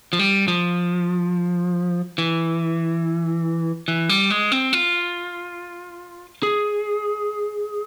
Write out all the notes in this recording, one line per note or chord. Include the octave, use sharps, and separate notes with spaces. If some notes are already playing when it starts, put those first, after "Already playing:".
F3
G3
F3
E3
E3
G3
G#3
C4
F4
G#4